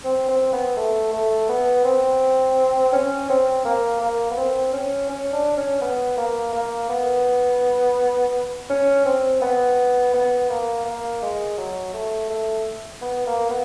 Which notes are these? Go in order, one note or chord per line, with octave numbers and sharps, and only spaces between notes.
C4
C4
B3
A3
A3
B3
C4
C#4
C4
A#3
A#3
B3
C4
C#4
C#4
D4
C#4
B3
A#3
A#3
B3
C#4
C4
B3
B3
A#3
A#3
G#3
F#3
A3
A3
B3
A#3
B3